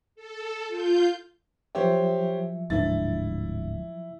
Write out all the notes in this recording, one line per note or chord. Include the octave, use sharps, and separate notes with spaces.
A4
F4 G6
F3 F#3 G4 C5 C#5 E5
D1 G#2 D4 E4 A6